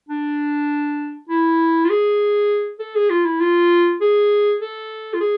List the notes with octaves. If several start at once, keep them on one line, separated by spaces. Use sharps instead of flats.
D4
E4
F4
G#4
A4
G#4
F4
E4
F4
G#4
A4
F4
G#4